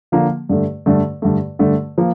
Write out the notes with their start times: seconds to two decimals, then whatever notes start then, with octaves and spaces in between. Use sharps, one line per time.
0.12 D3 F3 A#3
0.49 G2 D3 A3
0.86 G2 D3 A3
1.22 G2 D3 A3
1.59 G2 D3 A3
1.98 F3 A#3